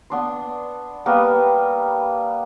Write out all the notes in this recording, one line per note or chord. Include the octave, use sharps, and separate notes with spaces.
B3 D4 C6
G3 A#3 B3 B4